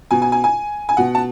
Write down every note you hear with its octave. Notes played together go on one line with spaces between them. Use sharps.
B2 G#5
G#5
G#5
G#5
G#5
B2 F#5
A5